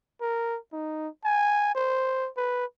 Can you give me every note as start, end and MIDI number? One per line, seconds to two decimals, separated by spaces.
0.21 0.58 70
0.73 1.08 63
1.25 1.74 80
1.75 2.30 72
2.37 2.65 71